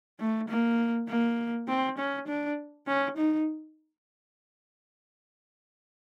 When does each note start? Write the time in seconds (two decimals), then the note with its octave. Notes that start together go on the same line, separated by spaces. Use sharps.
0.20 A3
0.49 A#3
1.09 A#3
1.68 C4
1.98 C#4
2.28 D4
2.87 C#4
3.17 D#4